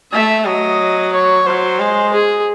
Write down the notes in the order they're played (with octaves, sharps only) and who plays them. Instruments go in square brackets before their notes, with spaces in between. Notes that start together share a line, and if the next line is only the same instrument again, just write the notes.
[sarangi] A3 [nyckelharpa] E5
[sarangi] F#3 [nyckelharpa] D#5
[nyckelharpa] C#5
[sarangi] F#3 [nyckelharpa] C5
[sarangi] G#3
[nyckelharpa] G#4